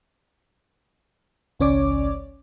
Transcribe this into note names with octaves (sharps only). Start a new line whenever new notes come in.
G#1 C#2 C#4 C#5 D5 D6